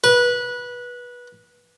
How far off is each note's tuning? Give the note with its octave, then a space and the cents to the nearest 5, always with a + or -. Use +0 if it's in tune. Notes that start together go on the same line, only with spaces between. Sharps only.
B4 -20